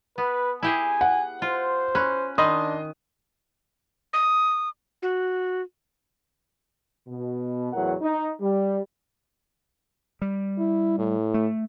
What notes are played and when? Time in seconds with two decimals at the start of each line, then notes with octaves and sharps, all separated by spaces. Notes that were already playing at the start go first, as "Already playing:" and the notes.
0.18 B3 B4
0.63 E4 G4 G#4 G#5
1.01 F#5
1.42 F4 C5
1.95 C#4 B5 F#6
2.38 D#3 D4 D#5 B5 C6 D#6
4.13 D#6
5.02 F#4
7.09 B2
7.73 E2 A2 F#3 A#4 F#5
8.02 D#4
8.41 G3
10.22 G3
10.59 E4
10.99 A2
11.34 A3